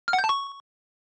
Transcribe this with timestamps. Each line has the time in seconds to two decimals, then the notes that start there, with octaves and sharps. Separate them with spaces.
0.08 F6
0.13 F#5
0.19 G6
0.24 A5
0.29 C#6